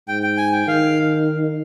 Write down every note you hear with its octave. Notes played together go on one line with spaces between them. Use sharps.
G#2 G5
G5
G#5
G5
D#3 F5